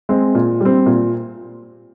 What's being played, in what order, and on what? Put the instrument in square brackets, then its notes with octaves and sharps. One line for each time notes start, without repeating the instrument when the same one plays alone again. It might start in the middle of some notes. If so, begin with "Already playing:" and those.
[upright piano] G#3 C4
A#2
G3 C4
A#2